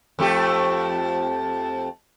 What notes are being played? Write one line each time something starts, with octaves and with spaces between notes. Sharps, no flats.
F2 A3 G4